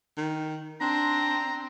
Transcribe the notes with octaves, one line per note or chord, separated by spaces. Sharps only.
D#3
C4 D4 A#5 C6